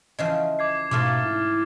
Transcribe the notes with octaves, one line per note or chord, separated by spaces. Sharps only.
C#3 E3 F3 D#5
D6 G#6 C7
G#2 B2 A3 A#3 D6 F6 A6
E4